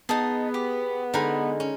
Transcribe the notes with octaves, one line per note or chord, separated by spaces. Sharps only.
B3 D#4 G#4 D#5 A5
G4
D3 G#3 D#4 A#4 G#5 B5
C#4